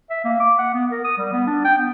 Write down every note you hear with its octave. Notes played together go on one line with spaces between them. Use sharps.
E5
A#3
D6
F#5
B3
A#4
D#6
G3
B3
D4
G5
B3